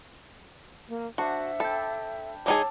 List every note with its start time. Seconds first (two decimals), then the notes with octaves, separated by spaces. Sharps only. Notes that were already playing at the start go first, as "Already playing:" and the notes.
0.88 A#3
1.18 D4 F#4 C5 E5 F#5
1.60 A4 G5 B5
2.46 G#3 D#4 G#4 C#5 A5 D6 E6